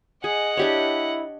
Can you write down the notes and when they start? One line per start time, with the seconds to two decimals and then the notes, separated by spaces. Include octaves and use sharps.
0.24 G#4 D#5 F#5 G#5
0.57 D4 E4 G4 C#5